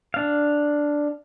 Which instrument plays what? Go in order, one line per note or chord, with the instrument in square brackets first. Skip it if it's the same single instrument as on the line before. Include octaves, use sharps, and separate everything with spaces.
[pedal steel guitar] D4 F5